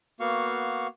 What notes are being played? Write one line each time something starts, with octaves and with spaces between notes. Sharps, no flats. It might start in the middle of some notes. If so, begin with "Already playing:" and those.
A#3 B3 F#4 F5 C#6